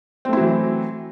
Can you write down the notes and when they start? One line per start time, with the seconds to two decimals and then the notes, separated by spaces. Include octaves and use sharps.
0.25 C4
0.29 A3
0.33 E4
0.37 F#3
0.41 E3